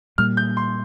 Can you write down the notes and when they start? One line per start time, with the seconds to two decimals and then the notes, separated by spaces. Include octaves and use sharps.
0.18 A#2 G3 A#3 F6
0.37 G6
0.57 C6